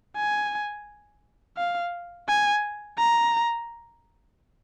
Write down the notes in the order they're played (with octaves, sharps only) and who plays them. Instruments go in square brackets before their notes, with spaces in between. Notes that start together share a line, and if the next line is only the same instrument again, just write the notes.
[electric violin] G#5
F5
G#5
A#5